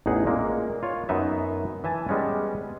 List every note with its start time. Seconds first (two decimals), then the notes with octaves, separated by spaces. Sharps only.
0.06 A1 E2 D#4 G#4 F#5
0.26 A#2 G#3 A#3
0.83 F4 C#5
1.09 F#2 B3 D#4 B4 E5
1.84 E3 E5 G#5 A5
2.09 G3 G#3 B3 C#4